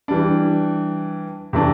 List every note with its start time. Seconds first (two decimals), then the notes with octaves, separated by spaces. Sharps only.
0.08 E3 G3 D4
1.53 C3 E3 A3 D4